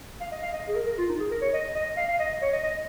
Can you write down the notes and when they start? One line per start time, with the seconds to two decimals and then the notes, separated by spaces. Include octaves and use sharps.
0.20 F5
0.31 D#5
0.42 F5
0.53 D#5
0.68 G#4
0.75 A#4
0.87 A#4
0.98 F4
1.09 D#4
1.20 G#4
1.31 A#4
1.41 C#5
1.53 D#5
1.75 D#5
1.97 F5
2.08 F5
2.19 D#5
2.42 C#5
2.53 D#5
2.63 D#5